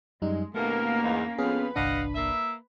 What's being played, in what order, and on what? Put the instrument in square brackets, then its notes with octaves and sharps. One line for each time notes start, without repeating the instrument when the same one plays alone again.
[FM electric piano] F#2 G3 D#4 [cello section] G#3
[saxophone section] D#2 B2 A#4 [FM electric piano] A3 [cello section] A#3 C#4
[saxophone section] E2 G#2
[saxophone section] F2 F5 [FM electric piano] B3 C#4 G#4 [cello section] B4
[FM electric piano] G1 C2 D4 [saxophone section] D#5 F5 F#5
[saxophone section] A#3 E5